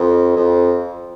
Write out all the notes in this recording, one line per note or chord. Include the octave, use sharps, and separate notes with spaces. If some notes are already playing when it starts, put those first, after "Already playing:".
Already playing: F2
F2